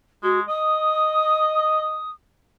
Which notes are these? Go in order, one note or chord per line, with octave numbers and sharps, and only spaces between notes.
G#3 F#4
D#5 D#6